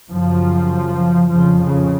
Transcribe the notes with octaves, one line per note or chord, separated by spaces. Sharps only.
F#2 C#3 F3
F2 C#3 F3
C#3